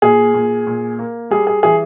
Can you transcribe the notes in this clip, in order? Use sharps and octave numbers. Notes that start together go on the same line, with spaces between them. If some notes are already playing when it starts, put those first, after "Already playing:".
A#2 G#4
A#2
A#2
A#3
G3 G#4
G#4
E3 G#4